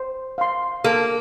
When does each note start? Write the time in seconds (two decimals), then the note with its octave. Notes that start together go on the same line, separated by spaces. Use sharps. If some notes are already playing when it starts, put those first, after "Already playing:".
Already playing: C5
0.38 F5 C6
0.84 A#3 A4